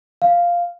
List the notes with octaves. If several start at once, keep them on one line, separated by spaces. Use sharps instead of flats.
F5